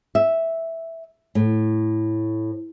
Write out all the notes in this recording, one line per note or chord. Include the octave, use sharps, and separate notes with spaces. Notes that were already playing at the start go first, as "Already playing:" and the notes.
E5
A2